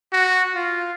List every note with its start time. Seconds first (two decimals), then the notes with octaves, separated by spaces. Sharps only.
0.13 F#4
0.55 F4